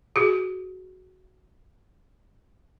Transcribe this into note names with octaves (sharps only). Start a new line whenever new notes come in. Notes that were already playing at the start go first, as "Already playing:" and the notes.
F#4 G#4